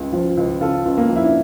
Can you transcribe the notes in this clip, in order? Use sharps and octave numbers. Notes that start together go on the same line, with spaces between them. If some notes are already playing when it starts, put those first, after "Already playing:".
Already playing: C#2 C#3
F3
C#2
C#3 F4 A4
C#2
A#3
F3
E4
D4